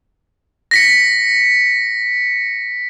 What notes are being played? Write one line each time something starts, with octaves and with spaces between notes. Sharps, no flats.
A#6 B6 C#7